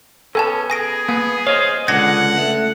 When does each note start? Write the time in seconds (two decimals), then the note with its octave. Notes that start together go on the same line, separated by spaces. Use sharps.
0.35 B3 C#4 A4 G#5 A5
0.70 G#4 G#5 A#6 D7
1.09 A#3 B3
1.47 C5 C#5 D#5 F5
1.88 C#2 D3 F#5 G#6 A#6 C#7
2.37 A3